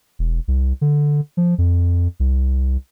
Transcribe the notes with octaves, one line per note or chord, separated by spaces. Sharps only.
E1
C2
D3
F3
F2
C2